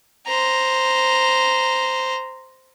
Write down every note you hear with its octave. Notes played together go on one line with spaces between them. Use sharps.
C5 A#5